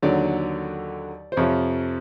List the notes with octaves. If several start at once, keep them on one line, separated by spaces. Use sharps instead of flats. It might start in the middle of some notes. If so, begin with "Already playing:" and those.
D#2 D3 F#3 D5
C5
F2 C3 F3 C#5